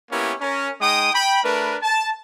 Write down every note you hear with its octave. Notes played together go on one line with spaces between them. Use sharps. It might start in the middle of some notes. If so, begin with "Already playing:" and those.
A#3 B3 C#4 E4 G4 A#4
C#4 A#4
G#3 D#4 G5 D#6
G5 B5
A3 D4 A#4 B4
A5